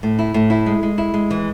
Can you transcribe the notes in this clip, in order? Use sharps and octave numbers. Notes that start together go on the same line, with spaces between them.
A2
E4
A2
E4
G#3
G#3
E4
G#3
E3